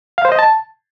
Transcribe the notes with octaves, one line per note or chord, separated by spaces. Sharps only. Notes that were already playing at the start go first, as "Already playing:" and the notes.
F5
C5
D#5
A5